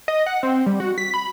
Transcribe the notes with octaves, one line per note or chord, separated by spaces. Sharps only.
D#5
F#5
C4
G3
F#4
B6
B5